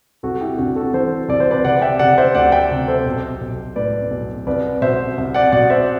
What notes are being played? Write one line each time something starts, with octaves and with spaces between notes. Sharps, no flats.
C2 F#4 A4
E4 G4
C2 D4 F#4
F#4 A4
E3 A4 C5
C2 D5
C5
B4 D5
C3 D5 F#5
E5 G5
C3 D5 F#5
C5 E5
D2 D5 F#5
E5 G5
C3
A4 C5
B1
B1
A2 B4 D5
B1
C2 B4 D5
B2 C5 E5
C2
D5 F#5
B2 D5 F#5
C5 E5